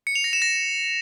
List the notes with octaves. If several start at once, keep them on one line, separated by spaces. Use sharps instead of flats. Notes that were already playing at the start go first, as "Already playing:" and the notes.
C#7
F7
A#6
E7
A#6